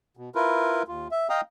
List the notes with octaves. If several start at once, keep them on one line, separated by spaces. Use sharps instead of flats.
B2
E4 F4 A#4 B4
D#2 F4
E5
D#5 F5 G5 A#5 D#6